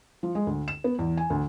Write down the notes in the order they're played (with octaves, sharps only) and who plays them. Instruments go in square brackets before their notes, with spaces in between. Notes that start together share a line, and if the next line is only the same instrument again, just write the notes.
[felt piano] F3
G#3
D2
E7
B3
E2
G#5
D2